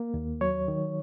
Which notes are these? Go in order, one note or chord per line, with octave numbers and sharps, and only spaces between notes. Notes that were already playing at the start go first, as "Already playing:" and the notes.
Already playing: A#3
D#2
F#3 C#5
D#3